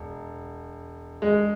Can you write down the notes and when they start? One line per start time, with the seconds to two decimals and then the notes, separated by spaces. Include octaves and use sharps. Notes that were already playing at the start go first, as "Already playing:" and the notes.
Already playing: E1
1.22 G#3